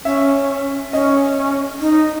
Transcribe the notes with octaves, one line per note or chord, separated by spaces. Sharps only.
C#4 E5
C#4 D#5
D#4